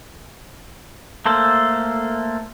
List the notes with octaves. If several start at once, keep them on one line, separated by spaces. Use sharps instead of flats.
A3 A#3 A4 C5